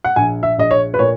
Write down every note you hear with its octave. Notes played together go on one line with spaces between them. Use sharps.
F#5
A#1 G#5
E5
A#1 D#5
C#5
B4
A#2 C#5